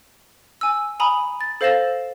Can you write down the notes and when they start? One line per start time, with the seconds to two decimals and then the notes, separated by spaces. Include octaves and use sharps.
0.61 G#5 E6
1.00 G#5 A#5 B5 D#6
1.41 A6
1.61 A4 C5 F5 A6 A#6 E7